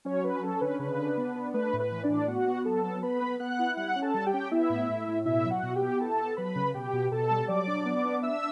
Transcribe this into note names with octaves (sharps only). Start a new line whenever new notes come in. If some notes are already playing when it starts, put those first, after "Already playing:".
F#3 C#4 C#5
C#4 B4
C#4 A4
D3 B4
C#3 B4
D4
B3
D4
A3 B4
A2
B4
E3
D4 D5
A2
B3 F#4 F#5
B3
F#3 A4 A5
B3
B3 B4 B5
B3
B3 F#5 F#6
E4
G3 F#5 F#6
C#4
A4 A5
G3
G4 G5
C#4
B3 E4 E5
A2
A2
A2
B2 E4 E5
F#3
F#4 F#5
B2
G4 G5
B3
E4 A4 A5
B3
F#3 B4 B5
C#3
B2 G4 G5
B2
B2 A4 A5
G3
F#3 D5 D6
D4
B3
D4
D4 E5 E6